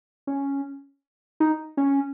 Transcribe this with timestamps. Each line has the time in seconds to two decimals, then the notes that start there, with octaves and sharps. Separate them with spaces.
0.27 C#4
1.40 D#4
1.77 C#4